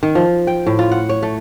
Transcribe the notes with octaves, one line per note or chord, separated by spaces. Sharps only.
D#3
F3
G5
A2
F4
F#5
C#5
A3